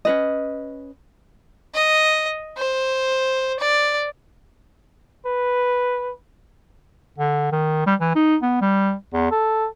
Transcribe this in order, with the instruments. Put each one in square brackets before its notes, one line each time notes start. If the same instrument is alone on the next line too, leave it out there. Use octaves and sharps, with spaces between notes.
[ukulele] C#4 B4 D#5
[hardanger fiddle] D#5
C5
D5
[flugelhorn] B4
[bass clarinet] D3
D#3
G3
E3
D#4
B3
G3
E2
A4